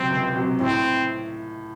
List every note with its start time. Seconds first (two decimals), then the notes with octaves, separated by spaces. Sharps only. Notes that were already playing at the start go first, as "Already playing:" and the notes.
Already playing: C#2 C3 F#3 C4
0.11 C#2
0.35 C3 F#3
0.60 A2 C4